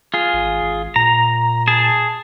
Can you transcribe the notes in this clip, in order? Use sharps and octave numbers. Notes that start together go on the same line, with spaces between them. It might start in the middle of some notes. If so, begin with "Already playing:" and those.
F4 G#4
G#1
G#1
A#2 A#5
G#4 A5